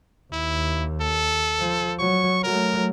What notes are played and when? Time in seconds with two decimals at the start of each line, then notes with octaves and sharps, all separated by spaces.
0.33 D#2 E4
1.01 A4
1.60 F3
1.99 F#3 C#6
2.43 F#3 A3 A#4